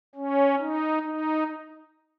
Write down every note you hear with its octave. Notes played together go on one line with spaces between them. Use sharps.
C#4
D#4
D#4